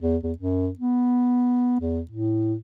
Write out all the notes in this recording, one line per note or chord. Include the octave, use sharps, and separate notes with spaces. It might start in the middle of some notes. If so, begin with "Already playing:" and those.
E2
E2
F#2
B3
E2
A2